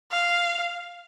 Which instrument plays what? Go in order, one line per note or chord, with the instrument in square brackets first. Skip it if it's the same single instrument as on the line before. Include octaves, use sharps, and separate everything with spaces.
[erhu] F5